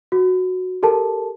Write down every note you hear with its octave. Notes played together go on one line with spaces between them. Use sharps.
F#4
G4 A4 A#4 A5